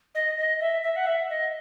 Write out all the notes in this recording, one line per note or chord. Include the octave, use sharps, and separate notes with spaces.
D#5
D#5
E5
E5
F#5
E5
D#5